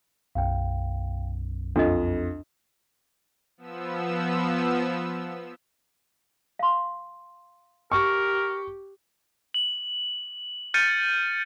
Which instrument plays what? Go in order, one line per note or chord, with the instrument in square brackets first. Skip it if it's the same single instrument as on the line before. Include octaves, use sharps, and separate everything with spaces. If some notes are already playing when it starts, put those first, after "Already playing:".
[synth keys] B1 F#2 [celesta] F5 G5
[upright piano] F2 [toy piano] D4 D#5 [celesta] A4
[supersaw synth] F3 B3 E6
[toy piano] F5 C6
[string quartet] G4 [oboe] A#4 [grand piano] C#6
[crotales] F#7
F6 G6 A6 C#7 D#7